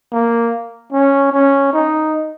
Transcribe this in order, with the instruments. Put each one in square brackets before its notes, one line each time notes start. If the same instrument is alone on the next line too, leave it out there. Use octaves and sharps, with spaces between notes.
[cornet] A#3
C#4
C#4
D#4